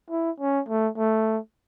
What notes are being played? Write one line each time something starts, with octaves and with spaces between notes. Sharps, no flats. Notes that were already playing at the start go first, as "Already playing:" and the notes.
E4
C#4
A3
A3